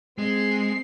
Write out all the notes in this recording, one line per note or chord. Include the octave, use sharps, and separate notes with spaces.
G#3 C4 C7